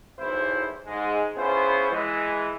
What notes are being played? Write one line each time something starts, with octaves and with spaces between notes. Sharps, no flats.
B1 E2 E4 C5
G#2 G#3
B3 C#4 E4 F4 G#4 C5
E3 G#3